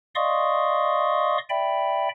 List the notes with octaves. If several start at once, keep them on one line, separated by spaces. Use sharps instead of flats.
D5 D#5 F5 C6 C#6 D#6
D5 E5 G5 B5